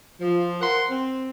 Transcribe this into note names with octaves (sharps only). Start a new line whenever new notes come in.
F3
A#4 C5 F#5 C6
C4